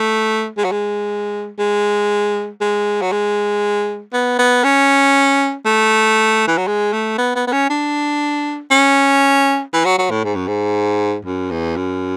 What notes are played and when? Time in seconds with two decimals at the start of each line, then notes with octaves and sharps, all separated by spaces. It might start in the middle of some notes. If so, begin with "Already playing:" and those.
Already playing: A3
0.57 G#3
0.64 F#3
0.72 G#3
1.59 G#3
2.61 G#3
3.02 F#3
3.12 G#3
4.13 B3
4.38 B3
4.64 C#4
5.65 A3
6.47 E3
6.58 F#3
6.67 G#3
6.93 A3
7.18 B3
7.36 B3
7.47 B3
7.52 C#4
7.70 D4
8.70 C#4
9.73 E3
9.85 F#3
9.98 F#3
10.10 A2
10.24 G#2
10.35 F#2
10.47 G#2
11.25 F#2
11.51 E2
11.76 F#2